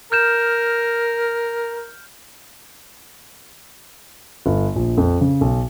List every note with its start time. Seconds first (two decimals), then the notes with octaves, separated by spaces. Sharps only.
0.12 A#4 F6 G6 E7
4.46 G1
4.76 A#1
4.98 F2
5.21 C#3
5.41 B1